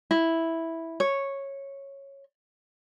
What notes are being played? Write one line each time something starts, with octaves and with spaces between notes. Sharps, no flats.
E4
C#5